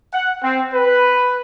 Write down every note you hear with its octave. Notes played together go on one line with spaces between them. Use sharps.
F#5
C4
B4